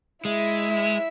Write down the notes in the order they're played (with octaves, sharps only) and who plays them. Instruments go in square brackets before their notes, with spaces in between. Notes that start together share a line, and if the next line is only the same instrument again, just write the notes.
[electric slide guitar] G#3 [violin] E4 E5